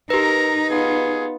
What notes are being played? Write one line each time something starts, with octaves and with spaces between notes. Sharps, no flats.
D#4 G4 A#4 B4 A#5
B3 F4 G#4